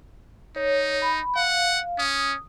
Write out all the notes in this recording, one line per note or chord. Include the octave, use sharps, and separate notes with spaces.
D#4 C#5
B5
F5 F#5
C#4 D#6